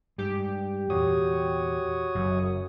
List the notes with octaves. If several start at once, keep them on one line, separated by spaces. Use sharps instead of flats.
G2 G#3 G4
E2 A#2 F#4 C#5 D#6
F#1 F#2